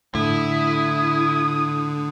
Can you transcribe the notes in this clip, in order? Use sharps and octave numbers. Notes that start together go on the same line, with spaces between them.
A2 D3 E4 D#6